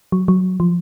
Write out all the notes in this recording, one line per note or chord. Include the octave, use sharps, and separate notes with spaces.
F#3
F#3
F3